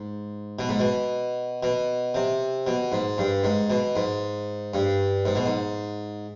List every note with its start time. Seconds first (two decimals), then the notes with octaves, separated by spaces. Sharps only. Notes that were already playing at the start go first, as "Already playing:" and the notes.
Already playing: G#2
0.59 B2
0.69 G#2
0.80 B2
1.63 B2
2.15 C3
2.67 B2
2.92 G#2
3.18 G2
3.44 G#2
3.70 B2
3.96 G#2
4.74 G2
5.26 G#2
5.35 B2
5.46 G#2